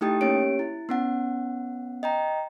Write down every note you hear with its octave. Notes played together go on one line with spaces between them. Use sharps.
A3 D#4 E4 G4 G5 D#6
A#3 C#4 G4 C#5 D7
E4
B3 C#4 F#5
D#5 G5 A#5